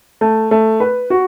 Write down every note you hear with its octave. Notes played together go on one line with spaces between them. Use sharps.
A3
A3
B4
F#4